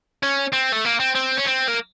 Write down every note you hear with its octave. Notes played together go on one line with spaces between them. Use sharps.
C#4
C4
A3
A#3
C4
C4
C#4
C4
A#3